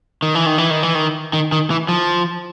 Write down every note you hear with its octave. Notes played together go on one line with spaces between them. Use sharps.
D#3
E3
D#3
E3
D#3
E3
D#3
D#3
D#3
E3
F3